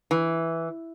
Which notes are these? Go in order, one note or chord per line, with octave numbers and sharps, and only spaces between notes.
E3